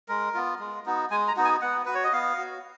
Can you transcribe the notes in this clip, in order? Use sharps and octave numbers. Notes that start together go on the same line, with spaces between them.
G#3 A#4
B3 F4
G#3
B3 D#4 F#4
G#3 G#5
A#5
B3 D#4 F#4
G#5
B3 F#5
F#4 B4
C#5
D#5
B3 F5
F#4